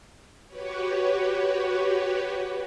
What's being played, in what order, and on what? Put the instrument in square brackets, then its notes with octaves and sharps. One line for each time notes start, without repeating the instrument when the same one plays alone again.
[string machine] F#4 G4 B4 C#5